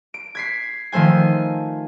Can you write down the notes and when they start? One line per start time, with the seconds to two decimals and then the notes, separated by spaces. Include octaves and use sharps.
0.14 D7
0.35 G#6 B6 C7
0.92 D#3 F3 A3 C5 G#5